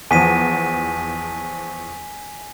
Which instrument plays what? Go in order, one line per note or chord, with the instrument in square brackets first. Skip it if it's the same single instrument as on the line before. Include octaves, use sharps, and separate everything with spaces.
[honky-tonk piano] E2 F3 [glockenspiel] G#5 B6 D#7